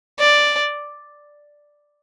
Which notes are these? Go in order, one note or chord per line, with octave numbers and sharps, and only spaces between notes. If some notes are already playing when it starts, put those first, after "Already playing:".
D5